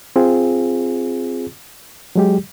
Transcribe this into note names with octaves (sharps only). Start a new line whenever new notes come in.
C4 F4 G#4
F#3 G#3 G4